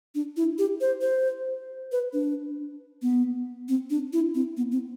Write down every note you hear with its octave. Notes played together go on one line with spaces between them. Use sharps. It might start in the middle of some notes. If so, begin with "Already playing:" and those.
D4
E4
G4
C5
C5
B4
D4
B3
C4
D4
E4
C4
B3
C4